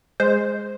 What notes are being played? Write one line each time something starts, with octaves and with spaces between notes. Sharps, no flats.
G#3 C5